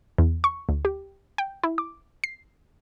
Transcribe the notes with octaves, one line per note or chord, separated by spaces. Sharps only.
E2
C#6
D2
G4
G5
E4
D6
C7